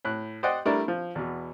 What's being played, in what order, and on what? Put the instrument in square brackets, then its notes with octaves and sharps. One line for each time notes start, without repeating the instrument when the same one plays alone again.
[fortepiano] A2 F#6
C5 D5 D#5 F#5 G5
G3 A3 D4 E4 A#4
F3
E2 B2